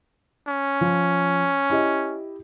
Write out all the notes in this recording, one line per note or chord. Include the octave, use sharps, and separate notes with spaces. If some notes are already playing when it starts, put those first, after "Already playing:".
C#4
F3
E4 G4 D#5